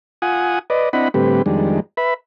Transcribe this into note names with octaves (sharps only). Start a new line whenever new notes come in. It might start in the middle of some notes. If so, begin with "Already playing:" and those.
F4 F#5 G#5 D#6
B4 D5 D#5
C4 D4 E4 D#5 F#5 B5
A2 D3 G3 C4 G4 B4
F2 D#3 G3 G#3 D4
B4 E5 B5